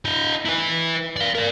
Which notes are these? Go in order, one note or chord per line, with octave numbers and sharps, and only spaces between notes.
E4 D#5
E4 B4
D5 F5
A#4 D5